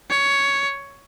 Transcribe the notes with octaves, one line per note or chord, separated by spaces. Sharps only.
C#5